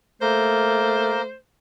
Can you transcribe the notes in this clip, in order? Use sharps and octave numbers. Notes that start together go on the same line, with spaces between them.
A3 A#3 A#4 C5